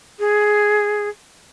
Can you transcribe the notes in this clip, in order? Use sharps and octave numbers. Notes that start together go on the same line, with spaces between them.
G#4